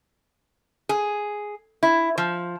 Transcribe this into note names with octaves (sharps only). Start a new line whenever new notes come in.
G#4
E4
F3